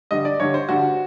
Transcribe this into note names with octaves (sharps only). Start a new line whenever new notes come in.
G2 D3 G3 D#5
D5
G2 D3 G3 C#5
C5
G2 D3 G3 F#4